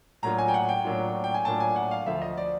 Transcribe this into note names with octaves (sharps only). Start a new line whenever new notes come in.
A2 F#3 A#3 D4 F4 A#5
G#5
G5
F#5
G5
A2 F#3 A#3 D4 F4
G5
G#5
A2 F#3 A#3 D4 F4 A5
G#5
F#5
F5
D2 D3 F3 E5
D#5
D5